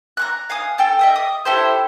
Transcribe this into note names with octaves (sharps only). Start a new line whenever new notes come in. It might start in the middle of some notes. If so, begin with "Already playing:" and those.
A#5 C#6 F#6
F5 G#5 D#6
A4 G5 A5
D#5 E5 D#6
D#6
E4 G4 A4 C5